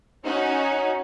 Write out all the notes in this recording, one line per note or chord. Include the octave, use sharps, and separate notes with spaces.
C#4 D#4 F#4